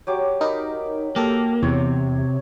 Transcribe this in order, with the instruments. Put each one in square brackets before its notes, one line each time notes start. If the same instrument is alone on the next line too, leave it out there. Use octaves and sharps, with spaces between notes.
[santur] F#3 G4 D6
[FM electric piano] D#4 A#4 [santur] B5 D6
[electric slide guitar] A#3 [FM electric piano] G4 A4
[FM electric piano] E2 [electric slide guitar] C3 [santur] C#5